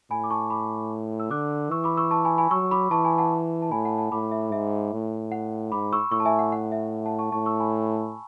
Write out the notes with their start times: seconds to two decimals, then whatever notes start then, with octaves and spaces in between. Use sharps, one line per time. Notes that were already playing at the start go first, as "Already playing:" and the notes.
0.11 A2 G#5 B5
0.24 D6
0.30 A5 C#6
0.50 B5 D6
1.20 E6
1.31 D3 D6 F#6
1.71 E3 C#6 E6
1.84 B5 D6
1.97 C#6 E6
2.11 A5 C#6
2.25 G#5 B5
2.38 G#5 B5
2.51 F#3 C#6 E6
2.71 B5 D6
2.91 E3 A5 C#6
3.05 G#5 B5
3.18 F#5 A5
3.62 A5
3.71 A2 G#5 B5
3.85 F#5 A5
3.98 F#5 A5
4.12 A2 B5 D6
4.31 E5
4.52 G#2 E5
4.93 A2
5.32 F#5
5.72 G#2 B5 D6
5.93 C#6 E6
6.12 A2 C#6 E6
6.20 A5
6.25 E5 G#5
6.39 F#5
6.52 F#5
6.72 E5
7.06 F#5 A5
7.19 A5 C#6
7.32 A2 A5 C#6
7.46 C#6 E6
7.59 G#5 B5